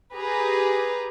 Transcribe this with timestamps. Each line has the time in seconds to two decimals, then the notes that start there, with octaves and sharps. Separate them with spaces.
0.15 G4 G#4 B4 A#5